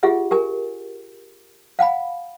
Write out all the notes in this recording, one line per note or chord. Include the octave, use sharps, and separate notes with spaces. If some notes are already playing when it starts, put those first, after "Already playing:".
F4 G4 G#4 E5 F#5
G4 A#4 G#5
F5 F#5 G#5 B5